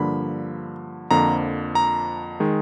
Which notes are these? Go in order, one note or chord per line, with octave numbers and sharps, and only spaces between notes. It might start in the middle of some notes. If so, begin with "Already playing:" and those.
Already playing: G2 D3 F3 A#3 B5
F2 D3 F3 A#3 A#5
A#5
D#3 G#3